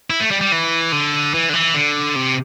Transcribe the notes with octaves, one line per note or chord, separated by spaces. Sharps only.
E4
A3
G3
G3
E3
D3
E3
D3
E3
D3
C3